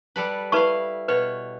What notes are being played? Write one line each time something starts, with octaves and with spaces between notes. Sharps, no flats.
G3 A4 B4
E4 B4 F5 A5 C#6
B2 B4 C#5